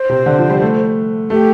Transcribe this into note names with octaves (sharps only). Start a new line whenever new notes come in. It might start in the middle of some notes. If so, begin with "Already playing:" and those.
Already playing: C5
C3
D3
F3
G3
A3
A3 G4